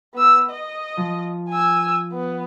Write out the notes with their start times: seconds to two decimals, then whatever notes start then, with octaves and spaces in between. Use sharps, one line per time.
0.14 B3 E6
0.50 D#5
0.97 F3
1.49 G#5 E6
2.13 B3